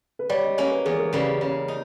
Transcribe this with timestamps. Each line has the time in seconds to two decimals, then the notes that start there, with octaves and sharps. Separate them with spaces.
0.19 B4
0.30 G3 C#5
0.44 D#5
0.57 A#3 C#4 C#5
0.71 B4
0.85 E2 G#4
0.99 A#4
1.13 C#3 G3 A#3 B4
1.40 C#3 C#5
1.68 D#4